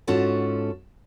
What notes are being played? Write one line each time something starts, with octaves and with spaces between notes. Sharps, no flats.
G#2 C#4 F4 F#4 A4 A5